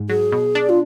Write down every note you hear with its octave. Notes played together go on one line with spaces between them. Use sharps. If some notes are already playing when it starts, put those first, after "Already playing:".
Already playing: G#2
F#3 G#4
B2
D4
F4